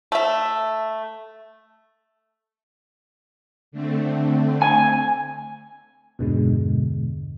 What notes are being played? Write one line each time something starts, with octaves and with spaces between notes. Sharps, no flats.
A3 E5
D3 A3 C4
G#5
E2 G2 B2 D3 G#3